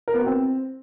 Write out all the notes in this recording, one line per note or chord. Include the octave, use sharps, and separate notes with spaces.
A#4
B3
F#4
C4